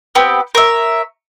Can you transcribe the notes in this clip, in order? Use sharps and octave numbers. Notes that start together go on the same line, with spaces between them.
B3 C4 G4
A#4 C#5 E5